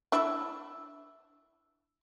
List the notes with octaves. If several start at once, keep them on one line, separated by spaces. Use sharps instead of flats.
D4 E4 E5